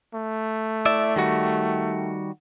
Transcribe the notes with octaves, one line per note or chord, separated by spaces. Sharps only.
A3
E4 D5 E5
D#3 G3 F#4